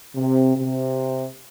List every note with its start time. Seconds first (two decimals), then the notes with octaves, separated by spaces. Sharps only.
0.16 C3
0.56 C3